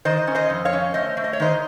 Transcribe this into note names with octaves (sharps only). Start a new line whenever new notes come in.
D#3 C5 D#5
C#4
C5 D#5
F2
C#5 F5
C#4
A3 C5 D#5
A3
D#5
C#5
D#3 C5 D#5